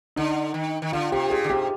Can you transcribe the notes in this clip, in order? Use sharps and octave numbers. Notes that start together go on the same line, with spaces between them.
D3 D#4
D#3
D#3
D3 F4
C3 G4
A#2 G#4
D3
C3 G4